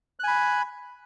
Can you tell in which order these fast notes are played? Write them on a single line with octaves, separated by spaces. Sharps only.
F#6 G#5 B5